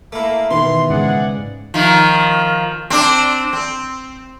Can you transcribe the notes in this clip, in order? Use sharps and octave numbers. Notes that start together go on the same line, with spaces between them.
A3 A#3 E4
B2 D#3 E3 C6
G#2 C#3 G#4 D5 F#5
D#3 F3
C4 D4
C4